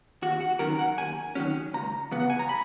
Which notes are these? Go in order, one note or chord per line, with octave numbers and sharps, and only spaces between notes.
D#2 F#4
F#4
D#3 F#3 C#4 A#4
F#5
D#2 G#5
D#3 F#3 C#4
C#2 A#5
C#3 E3 B3
F#5
G#5
A#5
B5